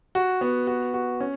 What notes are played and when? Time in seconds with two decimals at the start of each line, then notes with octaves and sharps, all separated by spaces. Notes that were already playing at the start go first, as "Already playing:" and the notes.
0.15 F#4
0.41 B3
0.67 F#4
0.94 F#4
1.20 C#4